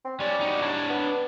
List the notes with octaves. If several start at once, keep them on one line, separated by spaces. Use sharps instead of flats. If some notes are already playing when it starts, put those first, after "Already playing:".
C4
G3 C#4 D5
D#4 F#4
D4 C#5
B3